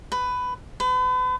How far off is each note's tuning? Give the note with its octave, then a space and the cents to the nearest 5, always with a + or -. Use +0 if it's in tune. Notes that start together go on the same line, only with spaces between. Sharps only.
B4 +15
B4 +40